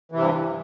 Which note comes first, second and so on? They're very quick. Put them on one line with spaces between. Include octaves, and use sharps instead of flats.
E3 C3 G2